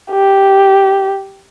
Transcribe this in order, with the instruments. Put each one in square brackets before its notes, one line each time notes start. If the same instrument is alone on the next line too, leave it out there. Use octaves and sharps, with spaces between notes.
[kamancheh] G4